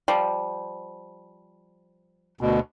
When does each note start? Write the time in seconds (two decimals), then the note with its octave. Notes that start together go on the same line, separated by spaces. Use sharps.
0.08 F3 G3
2.41 D2 B2